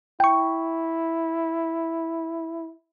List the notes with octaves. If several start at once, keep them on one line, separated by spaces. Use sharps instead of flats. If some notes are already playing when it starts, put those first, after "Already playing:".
E4 G5 C#6